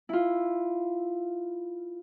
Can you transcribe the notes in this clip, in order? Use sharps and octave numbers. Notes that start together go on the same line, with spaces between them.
E4 F4